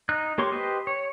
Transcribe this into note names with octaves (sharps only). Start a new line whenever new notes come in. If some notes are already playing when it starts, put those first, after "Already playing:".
D#4 F#6
A#3 G4 C#5 C6 C#6
G4 B4 C5 D#5
C#5